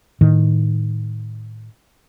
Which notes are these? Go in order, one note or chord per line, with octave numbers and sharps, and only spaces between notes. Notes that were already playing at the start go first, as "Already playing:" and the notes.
A2 D#3